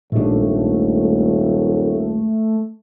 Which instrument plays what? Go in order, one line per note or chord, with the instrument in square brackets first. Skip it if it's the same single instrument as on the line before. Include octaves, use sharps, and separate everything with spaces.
[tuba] D#1 [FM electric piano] A#1 G#3 [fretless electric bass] G#2 D4 [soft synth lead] A3